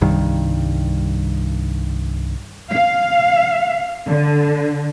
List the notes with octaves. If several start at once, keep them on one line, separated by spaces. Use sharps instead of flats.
C2 G2 D#3
F5
D3